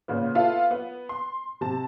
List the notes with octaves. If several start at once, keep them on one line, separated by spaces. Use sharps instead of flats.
A#2 C#3 B3
B3 F4 A4 E5
B3
C6
C3 A5